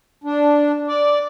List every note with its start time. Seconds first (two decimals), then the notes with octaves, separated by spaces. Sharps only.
0.24 D4
0.88 D5